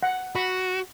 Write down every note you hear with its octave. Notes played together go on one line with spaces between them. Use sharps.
F#5
F#4 B5